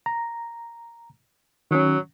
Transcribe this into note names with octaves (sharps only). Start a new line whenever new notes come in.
A#5
D#3 F#3 C#4